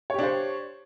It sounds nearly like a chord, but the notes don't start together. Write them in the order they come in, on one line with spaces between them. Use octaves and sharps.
C#5 G4 D4 C5